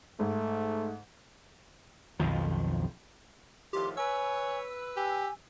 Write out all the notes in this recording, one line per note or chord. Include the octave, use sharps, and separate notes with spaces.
G#2 A3
B1 F2 D#3 F3
A2 D#3 F3 G4 C6
B4 C#5 G#5 E6
G4 G#5